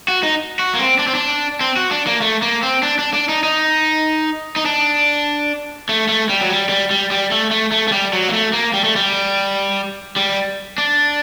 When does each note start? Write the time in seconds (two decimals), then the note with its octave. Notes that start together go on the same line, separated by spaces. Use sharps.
0.08 F#4
0.23 D#4
0.59 F#4
0.74 A#3
0.79 C4
0.99 D4
1.07 C4
1.15 D4
1.61 C4
1.77 F#4
1.91 D4
2.07 A#3
2.22 A3
2.42 A#3
2.63 C4
2.83 D4
2.99 D4
3.14 D4
3.29 D#4
3.43 D#4
4.56 D#4
4.66 D4
5.89 A3
6.09 A3
6.29 G3
6.41 F#3
6.50 G3
6.69 G3
6.91 G3
7.11 G3
7.31 A3
7.51 A3
7.72 A3
7.88 A3
7.92 G3
8.13 F#3
8.28 A#3
8.33 A3
8.53 A#3
8.74 G3
8.84 A3
8.96 G3
10.16 G3
10.78 D4